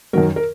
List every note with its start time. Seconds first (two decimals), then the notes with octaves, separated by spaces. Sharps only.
0.13 F#2 D#3 F#3 A#4
0.36 A#4